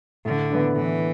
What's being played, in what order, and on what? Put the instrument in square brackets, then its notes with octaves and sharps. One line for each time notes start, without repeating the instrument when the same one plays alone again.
[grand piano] A2 [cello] D3
[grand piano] E3 B3 D4
[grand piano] A2 [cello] E3